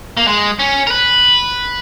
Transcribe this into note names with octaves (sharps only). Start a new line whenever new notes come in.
A#3
G#3
C#4
A#4
B4